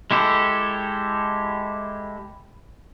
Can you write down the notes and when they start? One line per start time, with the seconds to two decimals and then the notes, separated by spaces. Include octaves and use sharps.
0.11 G#3 E4 G4 A4